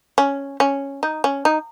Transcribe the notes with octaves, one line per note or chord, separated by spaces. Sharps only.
C#4
C#4
D#4
C#4
D#4